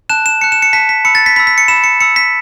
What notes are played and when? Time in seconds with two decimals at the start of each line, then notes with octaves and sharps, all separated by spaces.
0.09 A5 F#6 E7
0.26 E7
0.41 A5 F#6 C#7
0.52 E7
0.62 C#7
0.73 A5 F#6 B6
0.89 B6
1.05 B5 E6 C#7
1.15 A6
1.26 B6
1.36 B5 E6 B6
1.47 B6
1.58 C#7
1.68 B5 E6 E7
1.84 C#7
2.00 B5 E6 C#7
2.16 B6